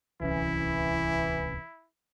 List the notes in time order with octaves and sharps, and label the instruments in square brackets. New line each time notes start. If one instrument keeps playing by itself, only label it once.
[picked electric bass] D1 C2 C#4 [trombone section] E3 [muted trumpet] E4